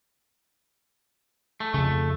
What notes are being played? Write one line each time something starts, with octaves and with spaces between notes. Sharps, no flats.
A3
F2 C#3 A3